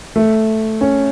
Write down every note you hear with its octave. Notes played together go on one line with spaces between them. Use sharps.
A3
C#4